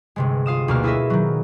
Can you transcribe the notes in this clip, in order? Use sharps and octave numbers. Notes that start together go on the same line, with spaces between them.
G1 C3 G#3
F4 F5 D#6 E7
D2 B2 A#3 A5 F6
E4 G#4 A4 C#5 D#5 E5
D#3 F#3